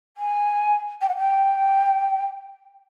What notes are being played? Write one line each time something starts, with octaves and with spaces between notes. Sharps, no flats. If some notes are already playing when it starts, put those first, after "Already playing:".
G#5
G5
F#5
G5